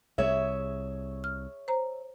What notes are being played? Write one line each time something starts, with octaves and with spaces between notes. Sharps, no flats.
C2 G#4 C#5 E5
F6
C5 A#5